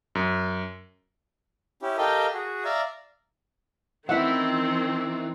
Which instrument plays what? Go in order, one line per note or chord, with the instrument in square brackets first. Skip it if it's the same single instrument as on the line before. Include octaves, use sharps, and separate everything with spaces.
[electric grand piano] F#2
[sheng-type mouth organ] C#4 E4 G4
G4 A4 A#4 D#5 F5 G5
F#4 G#4
D5 E5 F5 A#5
[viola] D#3 C4 [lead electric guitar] E3 [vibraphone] C#4 E6 [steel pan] E4 E5 F#5